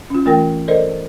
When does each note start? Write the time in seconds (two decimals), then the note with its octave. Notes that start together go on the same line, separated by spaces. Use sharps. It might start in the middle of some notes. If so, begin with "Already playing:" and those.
0.10 C#4 F4
0.26 E3 A3 F4 A#4 G5 A#6
0.68 A4 A#4 C5 D5 D#5